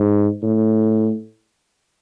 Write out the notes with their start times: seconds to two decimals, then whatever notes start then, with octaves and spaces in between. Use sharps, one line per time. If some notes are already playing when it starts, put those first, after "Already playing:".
Already playing: G#2
0.43 A2